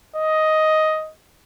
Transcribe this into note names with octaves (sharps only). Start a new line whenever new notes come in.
D#5